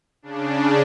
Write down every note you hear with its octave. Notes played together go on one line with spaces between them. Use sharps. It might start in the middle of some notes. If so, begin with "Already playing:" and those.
C#3 D4